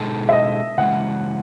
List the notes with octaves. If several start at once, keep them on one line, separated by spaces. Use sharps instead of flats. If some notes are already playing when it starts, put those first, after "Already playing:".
Already playing: B2 G#3 D#4 A4
E5
D#5
C#3 E3 G#3 F#5